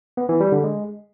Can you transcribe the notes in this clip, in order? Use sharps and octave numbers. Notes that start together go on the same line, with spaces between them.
B3
E3
G3
D3
G#3